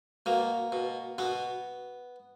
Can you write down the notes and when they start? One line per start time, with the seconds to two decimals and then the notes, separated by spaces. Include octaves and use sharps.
0.26 B2 A#3
0.72 B2
1.18 B2 B3